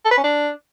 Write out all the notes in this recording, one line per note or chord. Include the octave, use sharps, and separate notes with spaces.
A4
B4
C#4
D4